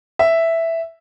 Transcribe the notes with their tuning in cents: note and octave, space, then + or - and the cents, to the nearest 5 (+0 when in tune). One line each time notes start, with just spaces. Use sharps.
E5 +0